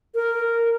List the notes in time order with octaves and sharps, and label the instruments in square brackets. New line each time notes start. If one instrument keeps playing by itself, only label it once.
[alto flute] A#4